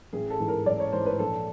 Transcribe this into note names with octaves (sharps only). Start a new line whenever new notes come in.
A1 G#4
A4
G#2 E3
A#4
A1 D5
C#5
G#2 E3 C5
B4
A#1 A4